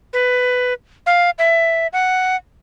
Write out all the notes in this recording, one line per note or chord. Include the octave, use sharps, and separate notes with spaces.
B4
F5
E5
F#5